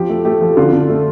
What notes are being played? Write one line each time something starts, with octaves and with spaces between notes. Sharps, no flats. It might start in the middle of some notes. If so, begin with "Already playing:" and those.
Already playing: F3 G4
A3
A3 G4
F3 A4
D3 F4
D3
A3